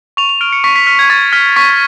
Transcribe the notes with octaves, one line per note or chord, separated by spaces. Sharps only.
C#6 F7
F7
F6 D7
C#7
C#6 B6
B6
F6 B6
G#6
C#6 A6
F6 B6
C#6 B6